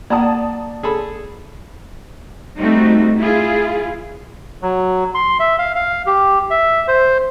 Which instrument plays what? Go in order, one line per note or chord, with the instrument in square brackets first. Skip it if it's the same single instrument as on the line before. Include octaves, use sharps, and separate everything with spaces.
[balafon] A#3 F#5 [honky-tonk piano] D5 A5 D#6 [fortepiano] A#5
[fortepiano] G#4 A4 B5
[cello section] G3 A3 C4 D#4 F#4
E4 F4 G#4
[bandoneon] F#3
C6
E5
F5
F5
G4
E5
C5